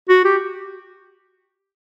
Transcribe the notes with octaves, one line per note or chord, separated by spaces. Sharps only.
F#4
G4